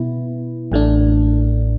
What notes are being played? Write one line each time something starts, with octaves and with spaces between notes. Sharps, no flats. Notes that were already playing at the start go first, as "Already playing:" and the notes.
Already playing: B2 B3 E4
A1 A2 A3 D4